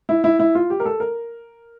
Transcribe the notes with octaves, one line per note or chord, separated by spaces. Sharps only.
E4
E4
E4
F4
G4
A#4
A4
A#4